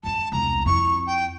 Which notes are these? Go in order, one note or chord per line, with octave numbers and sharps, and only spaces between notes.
F#2 F#3 A5
E1 C2 A#5
F2 E4 C#6
G5